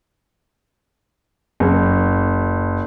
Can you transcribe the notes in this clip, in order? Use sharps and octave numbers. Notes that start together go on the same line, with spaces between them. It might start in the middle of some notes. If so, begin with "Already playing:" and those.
F#1